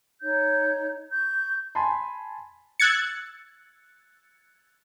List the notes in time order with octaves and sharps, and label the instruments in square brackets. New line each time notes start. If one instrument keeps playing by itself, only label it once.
[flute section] D#4 C#5 G6
C#6 G6
[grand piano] G#5 A5 B5 C6
[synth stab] E6 F#6 G#6 A6 C#7